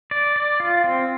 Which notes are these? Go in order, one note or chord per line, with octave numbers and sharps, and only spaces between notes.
D5
D5
F4
C4